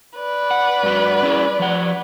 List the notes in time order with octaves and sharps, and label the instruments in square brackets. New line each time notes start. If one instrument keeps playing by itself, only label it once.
[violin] B4 D5
[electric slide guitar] F#5
G2 F#4
C#4 E4 G#4
F3 F#5